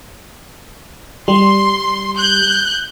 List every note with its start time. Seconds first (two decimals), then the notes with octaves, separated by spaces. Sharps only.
1.28 G3 C6
2.16 F#6 G6